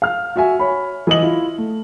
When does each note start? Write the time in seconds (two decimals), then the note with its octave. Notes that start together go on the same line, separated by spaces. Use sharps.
0.02 F5 F6
0.36 F#4 E5 G#5
0.59 C#5 B5
1.07 E3 D#5 F#7
1.22 E4 F4
1.58 A3